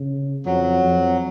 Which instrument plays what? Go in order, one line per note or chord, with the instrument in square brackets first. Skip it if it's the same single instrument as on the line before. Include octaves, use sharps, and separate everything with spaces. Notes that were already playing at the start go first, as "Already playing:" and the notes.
Already playing: [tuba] C#3
[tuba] F2 [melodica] F#3
[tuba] F2